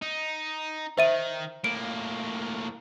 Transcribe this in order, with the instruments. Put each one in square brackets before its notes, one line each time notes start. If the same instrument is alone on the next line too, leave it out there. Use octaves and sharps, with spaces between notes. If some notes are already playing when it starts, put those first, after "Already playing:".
[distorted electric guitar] D#4
[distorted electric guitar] D#3 [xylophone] C5 E5 D#7
[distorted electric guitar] A2 A#3 [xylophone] D7